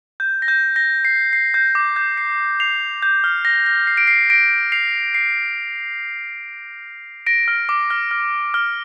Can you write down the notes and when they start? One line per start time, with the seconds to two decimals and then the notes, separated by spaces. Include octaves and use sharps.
0.20 G6
0.42 A#6
0.48 G6
0.76 A#6
1.05 C7
1.33 C7
1.54 G6
1.75 D6
1.96 G6
2.18 C7
2.60 C7 F7
3.02 G6
3.24 F6
3.45 A#6
3.66 A#6
3.87 C7
3.97 D7
4.07 C7
4.30 A#6 D7
4.72 C7 F7
5.15 C7
7.26 A#6 D7
7.48 F6
7.69 D6
7.90 F6
8.11 F6
8.54 F6